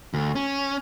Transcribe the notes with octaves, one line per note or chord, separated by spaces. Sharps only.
D2
C#4